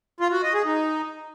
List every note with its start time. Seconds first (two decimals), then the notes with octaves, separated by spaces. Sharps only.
0.20 F4
0.32 F#4
0.43 D#5
0.54 G#4
0.65 D#4